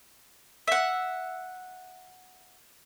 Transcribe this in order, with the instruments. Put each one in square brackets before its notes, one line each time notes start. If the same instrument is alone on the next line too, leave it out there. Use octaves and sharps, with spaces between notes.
[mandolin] E5 F#5